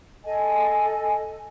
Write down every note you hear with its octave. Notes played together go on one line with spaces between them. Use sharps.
A4 D#5 G#5